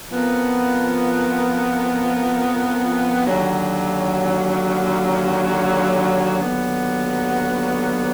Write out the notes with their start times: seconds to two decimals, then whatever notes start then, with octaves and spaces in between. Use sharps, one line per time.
0.09 F2 F3 B3 F4 A#4
3.25 D#2 D3 F#3
6.40 D#2 D3 F#3 B3